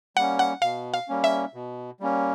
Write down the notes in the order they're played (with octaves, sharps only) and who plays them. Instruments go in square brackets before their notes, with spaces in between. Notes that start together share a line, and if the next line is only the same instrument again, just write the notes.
[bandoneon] G3 A#3 C#4 [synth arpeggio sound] F#5
[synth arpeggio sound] F#5
[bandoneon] B2 [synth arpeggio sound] F5
[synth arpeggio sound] F5
[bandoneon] G3 A#3 C#4
[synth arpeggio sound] E5
[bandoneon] B2
G3 A#3 C#4